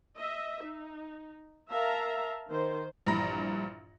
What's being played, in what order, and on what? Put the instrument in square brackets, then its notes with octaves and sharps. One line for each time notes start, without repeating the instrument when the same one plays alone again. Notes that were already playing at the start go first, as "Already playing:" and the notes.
[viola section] D#5 E5
D#4
A#4 E5 F5 A5 A#5
D#3 C5
[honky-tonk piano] A#1 G2 E3 A#5 B5 A#6